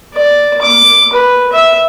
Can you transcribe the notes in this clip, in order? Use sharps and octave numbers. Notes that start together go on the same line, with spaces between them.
D5
D6
B4
E5